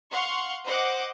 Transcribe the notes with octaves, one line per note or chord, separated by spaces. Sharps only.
F5 F#5 C6 C#6
C5 D#5 F#5 D6